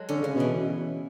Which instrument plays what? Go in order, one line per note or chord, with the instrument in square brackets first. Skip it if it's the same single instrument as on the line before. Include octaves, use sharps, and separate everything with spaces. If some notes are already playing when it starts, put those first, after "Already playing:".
Already playing: [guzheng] F#3 G#3 A4
[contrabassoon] D3 [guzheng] C#4
[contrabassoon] C#3 [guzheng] C#4
[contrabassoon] B2 [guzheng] E3